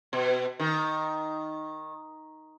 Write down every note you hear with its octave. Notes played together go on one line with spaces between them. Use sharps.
B2
D#3